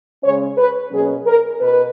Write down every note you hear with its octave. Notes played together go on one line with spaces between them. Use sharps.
C#3 G#3 C#4 C#5
B4
B2 F#3 A#3 C#4 G#4
A#4
B2 B4